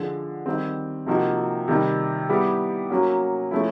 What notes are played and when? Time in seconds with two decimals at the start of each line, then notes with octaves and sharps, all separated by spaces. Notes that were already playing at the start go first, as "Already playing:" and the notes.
Already playing: D3 F3 G#3
0.46 D#3 G3 C4
1.06 C3 F3 A#3 D#4 F#4
1.68 C3 D#3 G3
2.29 G3 B3 E4 G4
2.90 F#3 A#3 C#4 F#4
3.51 F3 A3 C#4 E4